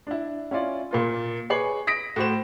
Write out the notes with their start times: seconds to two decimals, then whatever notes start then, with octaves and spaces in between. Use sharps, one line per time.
0.07 D4 E4
0.51 C#4 E4 F4 D5
0.91 A#2 A#3 F4
1.50 G#4 B4 C#5 D6 C7 F#7
1.87 D#6 A#6 B6 D7
2.16 A2 F#4 C5 E7